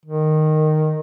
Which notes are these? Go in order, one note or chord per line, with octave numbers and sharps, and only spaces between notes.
D#3